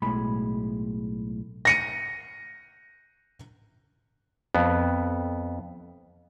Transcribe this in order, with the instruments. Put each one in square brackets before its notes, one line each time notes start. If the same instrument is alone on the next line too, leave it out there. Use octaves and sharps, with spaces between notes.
[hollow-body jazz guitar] B1 A2 G#3 B5
[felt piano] A#6 C#7 D#7
[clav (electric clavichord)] F2 B3